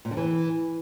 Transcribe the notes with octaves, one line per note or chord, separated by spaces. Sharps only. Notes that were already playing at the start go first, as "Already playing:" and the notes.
A#2
D3
E3